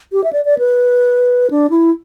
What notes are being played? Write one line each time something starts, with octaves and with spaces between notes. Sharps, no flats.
G4
E5
D5
D5
B4
D4
E4